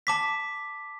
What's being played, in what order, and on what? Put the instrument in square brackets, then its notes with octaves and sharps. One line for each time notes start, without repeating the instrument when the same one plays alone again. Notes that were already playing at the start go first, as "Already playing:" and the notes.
[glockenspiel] A5 D6 B6